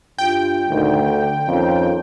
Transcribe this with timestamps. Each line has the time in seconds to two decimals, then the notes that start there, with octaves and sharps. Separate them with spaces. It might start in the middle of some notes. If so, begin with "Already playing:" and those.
0.18 G2 F4 G5
0.69 D2 G2 A#2 D#3
1.10 D3
1.47 F2 D#3 A#3 C#4